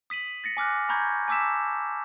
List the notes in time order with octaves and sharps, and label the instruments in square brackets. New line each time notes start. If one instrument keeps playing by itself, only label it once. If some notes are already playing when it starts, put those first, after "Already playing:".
[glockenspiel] D#6 B6 D#7 F#7
A6 A#6 C#7
G#5 D6 F6 F#6
G#5 A#5 B5 C#6 G6 G#6
G#5 A5 D6 E6 B6 E7